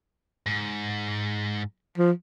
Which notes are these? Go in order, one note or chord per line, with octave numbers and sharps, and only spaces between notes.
G#2
F3